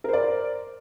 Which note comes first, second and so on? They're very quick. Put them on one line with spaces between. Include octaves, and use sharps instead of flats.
A#4 C5 D5